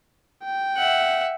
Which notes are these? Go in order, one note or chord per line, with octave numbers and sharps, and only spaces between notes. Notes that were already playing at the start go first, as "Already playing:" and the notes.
G5
E5 F#5